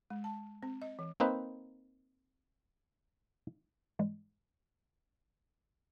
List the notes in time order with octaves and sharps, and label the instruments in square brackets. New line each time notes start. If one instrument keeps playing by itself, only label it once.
[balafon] G#3
A5
C4
D#5
E3
[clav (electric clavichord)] A#3 C4 D#4 B4 C5
[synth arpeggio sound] G#2 E3 G3 G#3